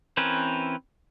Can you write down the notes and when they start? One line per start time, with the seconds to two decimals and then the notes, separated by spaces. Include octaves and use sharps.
0.17 E3 C4 C#4 A#4 B4